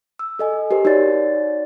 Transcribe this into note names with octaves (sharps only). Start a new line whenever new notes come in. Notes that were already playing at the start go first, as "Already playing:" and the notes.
E6
A4 D#5 G#5
G4 A#4 C5
D#4 F#4 C#5 D5 A6